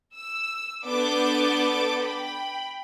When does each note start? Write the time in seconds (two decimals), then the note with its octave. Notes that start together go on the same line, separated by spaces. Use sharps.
0.14 E6
0.85 B3 D4 A4 D6 G6 A6
2.01 G5 B5